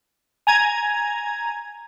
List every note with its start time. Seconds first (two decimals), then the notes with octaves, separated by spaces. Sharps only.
0.47 G#5 A#5 G#6